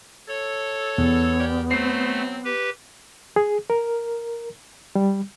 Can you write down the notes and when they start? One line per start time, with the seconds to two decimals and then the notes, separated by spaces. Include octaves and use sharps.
0.28 A4 C#5
0.98 E2 B3
1.39 G4 A#4 D5
1.71 F#3 A3 C4 C7
2.44 G4 B4
3.36 G#4
3.70 A#4
4.95 G3